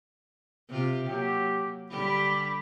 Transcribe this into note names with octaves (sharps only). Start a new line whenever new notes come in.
C3 F4 G4
F#3 A#3 G4
D3 G3 G4 B5